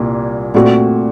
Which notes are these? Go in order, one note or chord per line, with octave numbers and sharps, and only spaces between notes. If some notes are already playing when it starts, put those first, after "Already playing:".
Already playing: C2 A#2 A#3
A#2 A3 C4 F#4